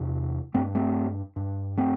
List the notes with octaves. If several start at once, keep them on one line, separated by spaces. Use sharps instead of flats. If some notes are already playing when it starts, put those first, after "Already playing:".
Already playing: E2 C3
G2 A3 C4
A3 C4
G2
A3 C4